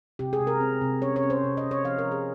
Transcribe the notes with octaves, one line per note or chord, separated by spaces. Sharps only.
C3 G4
G#4
C3
A#4
C4
C3
C#4 C#5
C#5
C#4
C5
C3
D#5
C3
C#5
F3 F5
A#4
F3
G#4